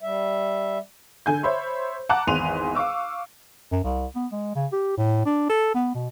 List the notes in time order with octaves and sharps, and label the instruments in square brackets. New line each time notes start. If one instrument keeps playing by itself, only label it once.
[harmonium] G3 E5
[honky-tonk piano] D3 G#5 G6
C5 C#5 E5 B5 C6
F#5 A5 A#5 D6 F#6
G#1 E2 C6 D#7 F7
F5 C#6 D6 E6
[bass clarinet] F#2
C2
B3
G#3
C#3
G4
A2
D4
A4
B3
B2